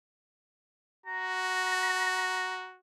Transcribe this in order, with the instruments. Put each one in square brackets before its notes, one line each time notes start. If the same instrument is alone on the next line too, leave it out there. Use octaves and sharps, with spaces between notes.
[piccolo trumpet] F#4 [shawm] A#5